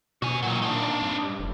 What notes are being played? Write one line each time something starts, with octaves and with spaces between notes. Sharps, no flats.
B2 F#4 G#5
A#2 D#3 F#3
D4 D#4
G2
F1